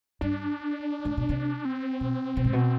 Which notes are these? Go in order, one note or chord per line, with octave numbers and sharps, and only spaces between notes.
G2 D4
G#2
B2
C3
C4
B2
B2
G#2
B2